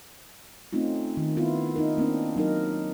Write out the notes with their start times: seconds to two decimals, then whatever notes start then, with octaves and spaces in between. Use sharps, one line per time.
0.73 A3 C4 C#4 D#4 F4
1.17 D#3
1.37 D#3 B3 E4 F4
1.76 D#4 A#4
1.98 A#3 C4 D4
2.36 F#3 D#4 A#4